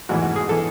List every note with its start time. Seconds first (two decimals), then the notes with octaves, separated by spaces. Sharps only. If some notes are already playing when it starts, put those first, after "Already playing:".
0.09 A1 G#2 E3 F#4
0.22 F#4
0.36 G#4
0.49 E3 A4